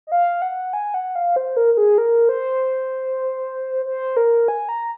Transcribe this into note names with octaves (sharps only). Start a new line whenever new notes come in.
D#5
F5
F#5
G#5
F#5
F5
C5
A#4
A#4
G#4
A#4
C5
C5
A#4
G#5
A#5